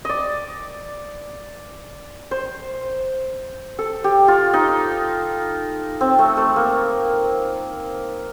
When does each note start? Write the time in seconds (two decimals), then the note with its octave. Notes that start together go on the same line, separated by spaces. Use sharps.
0.05 D5 D#5
2.31 C5
3.79 A4
4.04 G4
4.28 F4
4.54 D#4
6.01 C4
6.19 A3
6.37 A3
6.56 A#3